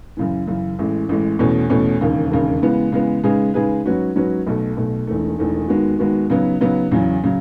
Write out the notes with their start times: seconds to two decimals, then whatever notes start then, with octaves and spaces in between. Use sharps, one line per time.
0.17 F#2 C#3 E3
0.47 F#2 C#3 E3
0.79 A1 A2 G#3
1.09 A1 A2 G#3
1.39 E2 B2 A3 C#4
1.70 E2 B2 A3 C#4
2.01 E1 D#2 C#3
2.31 E1 D#2 C#3
2.62 C#3 E3 G#3 B3
2.92 C#3 E3 G#3 B3
3.23 C#3 G#3 D#4 G#4 B4
3.54 C#3 G#3 D#4 G#4 B4
3.85 G#2 F#3 C#4 F#4 B4
4.15 G#2 F#3 C#4 F#4 B4
4.47 B1 B2 A3
4.77 B1 B2 A3
5.07 E1 E2 D#3 A3
5.39 E1 E2 D#3 A3
5.68 D#2 D#3 G#3 B3 F#4
5.99 D#2 D#3 G#3 B3 F#4
6.30 C#3 F#3 B3 D#4
6.61 C#3 F#3 B3 D#4
6.91 E2 C#3 F#3
7.24 C#3 F#3